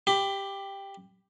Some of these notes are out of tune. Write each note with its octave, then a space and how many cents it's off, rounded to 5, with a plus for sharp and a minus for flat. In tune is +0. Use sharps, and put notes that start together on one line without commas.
G4 +5 B5 +20